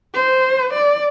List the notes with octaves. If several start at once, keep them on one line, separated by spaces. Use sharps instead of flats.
C5
D5